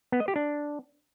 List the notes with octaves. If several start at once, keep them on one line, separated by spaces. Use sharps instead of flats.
B3
D#5
G4
D4